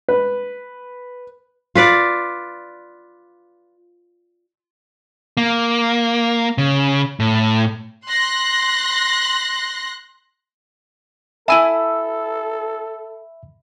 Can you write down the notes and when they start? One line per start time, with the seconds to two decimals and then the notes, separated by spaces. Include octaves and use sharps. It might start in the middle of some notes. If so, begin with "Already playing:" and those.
0.09 B4
1.75 F4 B4 D5
5.37 A#3
6.58 C#3
7.20 A2
8.07 C6 F#6 A#6
11.48 E4 A4 E5 G#5 A5 B5 E6